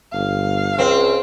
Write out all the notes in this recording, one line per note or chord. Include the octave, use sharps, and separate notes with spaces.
G1 F5
C#2 C4